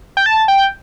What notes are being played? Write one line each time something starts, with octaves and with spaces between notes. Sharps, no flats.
G5
A5
G5